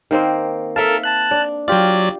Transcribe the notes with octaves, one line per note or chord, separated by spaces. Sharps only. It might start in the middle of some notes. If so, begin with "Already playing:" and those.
D#3 A#3 C4
A4 A#4 E5 F5 A5
A5 F#6
D4
F#3 F4 G4 D5